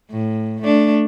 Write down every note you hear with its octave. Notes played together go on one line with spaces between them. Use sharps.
A2
A3 D4